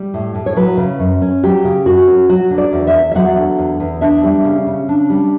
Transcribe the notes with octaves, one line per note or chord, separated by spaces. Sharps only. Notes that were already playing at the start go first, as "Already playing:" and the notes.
Already playing: G3
A2
A2
C#5
F#3 B4
C#3
F#2
C#4
F#3 G4
C#3
F#2 F#4
C#4
F#3 F#4
D3
D5
E2
E5
E2
E5
F#3 F#5
D3
E2
E2
D4 E5
G3
C#3
C#3
D4
G3